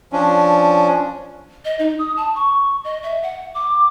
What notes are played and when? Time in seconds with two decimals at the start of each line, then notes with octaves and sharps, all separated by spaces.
0.12 F3 C#4 D4
1.65 D#5
1.79 D#4
1.99 D#6
2.17 A5
2.35 C#6
2.84 D#5
3.03 E5
3.23 F#5
3.55 D6